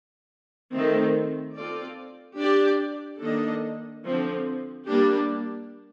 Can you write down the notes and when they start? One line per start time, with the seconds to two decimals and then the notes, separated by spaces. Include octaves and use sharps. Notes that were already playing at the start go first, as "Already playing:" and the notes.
0.73 D#3 A3 C4
1.56 C4 F4 A4 D5
2.38 D4 G4 D5
3.20 D#3 A#3 D4 A4 D#5
4.03 D3 F3 C4
4.86 G3 A#3 D4 G4